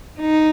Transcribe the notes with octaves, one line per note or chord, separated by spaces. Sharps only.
D#4